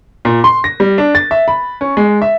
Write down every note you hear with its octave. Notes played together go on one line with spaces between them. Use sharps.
A#2
C6
A#6
G3
D4
A6
E5
B5
C#4
G#3
E5